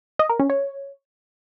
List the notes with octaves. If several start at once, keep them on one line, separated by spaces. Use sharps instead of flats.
D#5
A#4
C#4
C#5